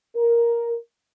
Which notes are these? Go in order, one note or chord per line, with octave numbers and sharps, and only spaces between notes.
A#4